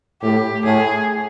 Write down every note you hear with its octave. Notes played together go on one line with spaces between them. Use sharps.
A2 G4
A2 G#4